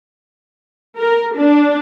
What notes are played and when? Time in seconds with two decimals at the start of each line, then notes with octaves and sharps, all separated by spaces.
0.99 A#4
1.37 D4